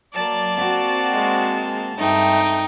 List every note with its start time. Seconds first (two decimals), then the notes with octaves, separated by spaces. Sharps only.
0.14 F#3 A#3 D5 A5
0.56 C4 F#4
1.13 G#3
1.98 G2 A3 C4 D#4 G5